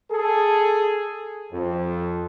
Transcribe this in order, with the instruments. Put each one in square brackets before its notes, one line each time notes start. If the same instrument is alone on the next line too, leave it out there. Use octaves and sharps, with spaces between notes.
[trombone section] G#4 A4
F2